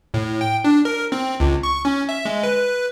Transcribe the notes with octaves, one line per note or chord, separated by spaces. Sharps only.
A2
G5
D4
A#4
C4
C#2
C#6
C#4
E5
G#3
B4